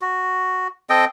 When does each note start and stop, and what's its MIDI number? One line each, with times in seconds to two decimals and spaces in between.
0.01 0.68 66
0.90 1.05 60
0.90 1.05 69
0.90 1.05 75
0.90 1.05 79